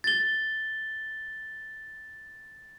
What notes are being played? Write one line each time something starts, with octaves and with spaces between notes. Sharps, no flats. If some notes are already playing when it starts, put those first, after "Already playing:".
A6 G7